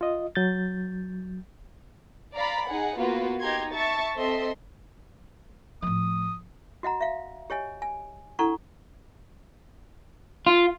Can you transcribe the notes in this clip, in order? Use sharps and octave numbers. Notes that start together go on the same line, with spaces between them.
F4 D#5
F#3 G6 A6
D5 F5 A#5 B5
D#4 G#4 F#5
A#3 B3 F4 F#4 B4
D#4 G4 A#5 C6 G#6
E5 A5 C#6 A6
C4 A4 D#5 E5 C6
A2 F3 D#6
F#4 D#5 F#5 A#5
E5 F5
G4 C#5 D#5 G#5
G#5
D4 E4 A4 F#5 A#5 C#6
F4